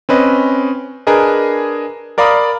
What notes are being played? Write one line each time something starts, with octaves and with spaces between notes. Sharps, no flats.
C4 C#4 B4 D#5
D4 G#4 A#4 B4 D#5
A#4 D5 F5 A#5 B5 D#6